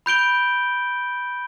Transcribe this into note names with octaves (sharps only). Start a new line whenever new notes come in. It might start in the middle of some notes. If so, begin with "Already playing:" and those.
B5 G6 D7 G7